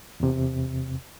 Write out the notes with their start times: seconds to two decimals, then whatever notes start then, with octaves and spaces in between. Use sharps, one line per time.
0.20 E2 C3